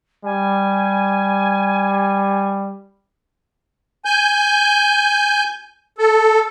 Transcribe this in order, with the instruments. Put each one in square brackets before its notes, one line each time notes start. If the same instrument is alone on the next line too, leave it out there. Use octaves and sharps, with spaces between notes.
[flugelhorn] G3 [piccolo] G#5
[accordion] G#5 G6
A4